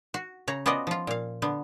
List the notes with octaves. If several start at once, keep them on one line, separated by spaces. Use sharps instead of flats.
F#4
C#3 C#5 A#5
B3 C#4 F4 F#4 D5 D#5
F3 F4
A#2 F5
D3 B3